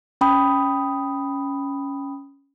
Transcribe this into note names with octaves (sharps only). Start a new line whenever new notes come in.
C#4 G5 B5 D#6